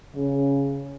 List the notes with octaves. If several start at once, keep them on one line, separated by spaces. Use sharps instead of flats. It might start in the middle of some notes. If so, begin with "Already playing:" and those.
C#3